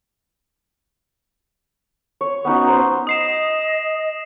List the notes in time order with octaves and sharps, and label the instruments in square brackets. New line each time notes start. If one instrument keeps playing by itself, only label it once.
[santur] C#5
B3 C#4 D#4 F#4
C5 A#5
[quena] D#5 [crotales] D#6 C7 E7